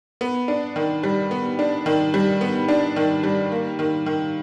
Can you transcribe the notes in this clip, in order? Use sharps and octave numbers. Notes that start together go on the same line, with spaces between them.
B3
D4
D#3
G3
B3
D4
D#3
G3
B3
D4
D#3
G3
A#3
D#3
D#3